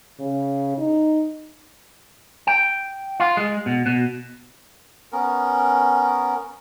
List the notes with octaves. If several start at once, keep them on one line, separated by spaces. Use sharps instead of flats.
C#3
D#4
G5
F4
G#3
B2
B2
B3 C#4 A#4